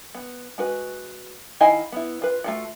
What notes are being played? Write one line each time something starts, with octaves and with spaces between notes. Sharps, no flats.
B3
G#3 F#4 B4
D#3 E4 D#5 F5 G#5
B3 E4
F4 B4
A3 F4 F#4